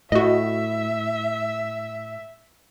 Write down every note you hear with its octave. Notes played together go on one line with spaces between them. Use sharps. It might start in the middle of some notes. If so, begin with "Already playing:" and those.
A2 F#4 D#5 E5